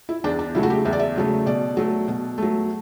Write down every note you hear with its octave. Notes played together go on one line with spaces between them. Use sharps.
E4
E2 D4
D4
C#3 F#3 A3 E4
F#4
G4
E2 E5
D5
E5
C#3 F#3 A3
B2 D5
F#3 A3
B2
F#3 A3